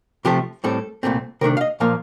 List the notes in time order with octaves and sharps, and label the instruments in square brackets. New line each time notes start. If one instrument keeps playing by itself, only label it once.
[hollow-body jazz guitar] C3 F3 A3 G4
A2 G3 C4 A4
C2 A#2 A3 C4
C3 D#3 A3 D4 A#4
F5
D#5
A#2 F3 A#3 F5